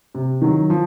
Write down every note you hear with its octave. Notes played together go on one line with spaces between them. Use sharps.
C3
D#3 F#3
F3